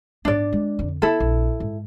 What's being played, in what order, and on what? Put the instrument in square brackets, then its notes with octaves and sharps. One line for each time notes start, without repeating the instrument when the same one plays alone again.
[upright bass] G#2 B3 [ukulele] D4 D5
[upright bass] G#3
F2 D3
[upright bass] B3 [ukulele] E4 A4
[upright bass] A#1
G#2